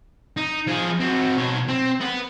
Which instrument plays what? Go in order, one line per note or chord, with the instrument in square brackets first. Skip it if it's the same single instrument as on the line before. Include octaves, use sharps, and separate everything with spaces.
[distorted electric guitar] D#4
F3 G#4
C4 F#4
B2 C#5
C4
B3 B4